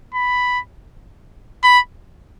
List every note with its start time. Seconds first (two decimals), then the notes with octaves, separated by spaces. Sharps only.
0.15 B5
1.64 B5